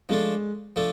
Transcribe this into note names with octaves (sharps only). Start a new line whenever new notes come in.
F3 G#3 A3 D4 A4
F3 A3 D4 A4